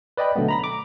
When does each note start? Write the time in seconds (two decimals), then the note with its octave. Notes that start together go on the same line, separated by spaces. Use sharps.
0.17 B4 D5 D#5 G5 B5
0.36 B2 D3 F#3 A3 B3
0.48 A#5 B5 A#6
0.64 D6